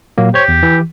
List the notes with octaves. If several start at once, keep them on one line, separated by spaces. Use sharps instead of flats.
A#2 F#3 A#3
G4 C5 C#5
E2
E3